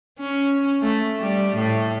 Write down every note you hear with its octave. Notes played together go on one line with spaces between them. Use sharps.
C#4
A3
G3
A2